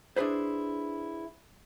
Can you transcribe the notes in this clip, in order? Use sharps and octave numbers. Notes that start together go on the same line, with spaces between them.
D4 E4 G#4 B4 C5